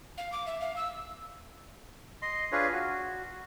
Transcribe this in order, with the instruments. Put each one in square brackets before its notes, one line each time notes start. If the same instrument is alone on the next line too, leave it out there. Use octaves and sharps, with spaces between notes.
[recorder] F5
D6
E5
F5
E6
[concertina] D#5 C6
D4 F4 G#4 B4 C#5
F#4